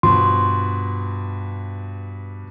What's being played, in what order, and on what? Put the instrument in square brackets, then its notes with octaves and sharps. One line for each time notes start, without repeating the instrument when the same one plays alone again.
[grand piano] G2 B2 F3 [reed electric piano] C6